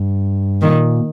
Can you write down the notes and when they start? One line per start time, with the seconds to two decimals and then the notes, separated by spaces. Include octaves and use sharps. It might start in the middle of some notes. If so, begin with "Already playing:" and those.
Already playing: G2
0.62 A#2 D#3